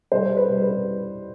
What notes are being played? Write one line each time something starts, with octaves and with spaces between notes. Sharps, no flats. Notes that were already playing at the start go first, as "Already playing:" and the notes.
G3 C5
B4
G3
B4